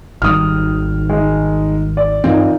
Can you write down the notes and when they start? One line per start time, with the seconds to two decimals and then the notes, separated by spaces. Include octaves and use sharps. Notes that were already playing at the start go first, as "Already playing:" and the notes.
0.22 G#1 D#3 G3 D#6 F6
1.10 G#3 D#4
1.97 D5
2.24 G2 A#2 E3 C4 D#4